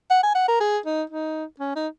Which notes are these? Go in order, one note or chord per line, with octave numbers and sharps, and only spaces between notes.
F#5
G#5
F#5
A#4
G#4
D#4
D#4
C#4
D#4